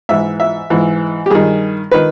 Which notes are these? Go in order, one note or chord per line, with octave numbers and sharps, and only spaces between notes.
G#2 E3 E5
E5
G#2 E3
G4
G2 D#3 G#4
D#3 B4